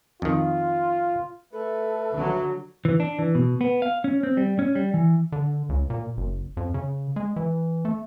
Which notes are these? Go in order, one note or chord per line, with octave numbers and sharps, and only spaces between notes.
F2 D#3 F4
A3 A4 B4
D3 F#3
E3
D4
E3
B2
B3
F5
C#4
C4
G3
C#4
G3
E3
D3
C#2
A#2
F#1
F2
C#3
G#3
E3
A3